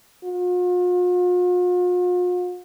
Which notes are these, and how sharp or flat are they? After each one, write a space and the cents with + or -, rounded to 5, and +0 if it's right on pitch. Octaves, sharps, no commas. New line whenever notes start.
F4 +45